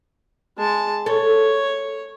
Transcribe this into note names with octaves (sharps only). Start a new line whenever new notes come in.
G#3 A5
A4 C#5